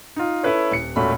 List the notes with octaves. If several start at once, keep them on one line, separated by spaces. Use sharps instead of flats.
D#4 F4
C#4 E4 A4 B4 C#5
D#1 C#7
E1 A#2 A3 C#4 F#4 B5